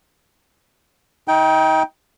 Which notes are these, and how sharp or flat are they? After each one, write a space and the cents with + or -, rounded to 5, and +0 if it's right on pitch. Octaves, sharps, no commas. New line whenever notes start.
D#4 +35 G5 -5